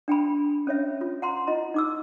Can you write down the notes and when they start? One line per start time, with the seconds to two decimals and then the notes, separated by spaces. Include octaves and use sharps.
0.08 D4 G5 G#5 B5
0.67 C#4 C#5 E5
1.01 F4
1.22 F#5 A#5 C6
1.47 E4 F4 D#5 A#5
1.74 D#4 D6 E6